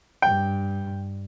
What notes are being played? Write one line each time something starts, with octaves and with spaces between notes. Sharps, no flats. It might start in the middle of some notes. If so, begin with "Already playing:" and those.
G2 G5